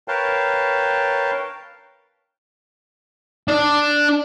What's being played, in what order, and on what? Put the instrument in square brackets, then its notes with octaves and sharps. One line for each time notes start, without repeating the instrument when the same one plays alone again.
[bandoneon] A#4 B4 C#5 F5 G5 A5
[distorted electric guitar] D4 D5